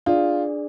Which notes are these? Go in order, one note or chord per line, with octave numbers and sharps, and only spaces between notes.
D4 F4 G#4 D5